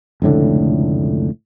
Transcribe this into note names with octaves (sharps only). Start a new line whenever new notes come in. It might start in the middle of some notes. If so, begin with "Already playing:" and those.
F1 C#2 A2 D3